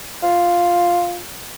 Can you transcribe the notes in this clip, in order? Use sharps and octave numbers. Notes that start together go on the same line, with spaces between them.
F4